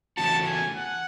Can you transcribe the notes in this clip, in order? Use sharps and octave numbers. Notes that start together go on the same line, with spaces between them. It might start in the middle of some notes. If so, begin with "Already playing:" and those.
C#3 E3 A3 C#4 F#4 A5
G#5
F#5